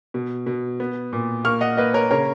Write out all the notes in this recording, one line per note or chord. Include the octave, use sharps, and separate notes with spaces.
B2
B2
B3
A#2
A#3 C#6 F6
D#5 F#5
A#3 B4 D#5
A#4 C#5
C#3 A#4 C#5